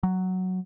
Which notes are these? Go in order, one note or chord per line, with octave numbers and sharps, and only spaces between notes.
F#3